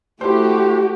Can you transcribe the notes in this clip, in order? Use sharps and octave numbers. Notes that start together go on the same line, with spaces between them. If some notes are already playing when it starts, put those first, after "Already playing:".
A3 E4 F#4 G4 C5